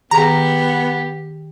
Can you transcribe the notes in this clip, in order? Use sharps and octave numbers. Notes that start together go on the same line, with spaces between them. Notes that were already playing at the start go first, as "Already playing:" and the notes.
D#3 B3 G4 G#4 A#5